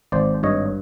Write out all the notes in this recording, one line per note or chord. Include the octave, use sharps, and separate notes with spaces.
G#1 C5 D5
G2 C#5 D#5